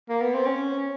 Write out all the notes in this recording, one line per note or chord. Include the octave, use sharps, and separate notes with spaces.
A#3
B3
C4
C#4